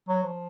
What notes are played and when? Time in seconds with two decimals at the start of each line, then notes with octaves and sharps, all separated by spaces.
0.09 F#3
0.23 F3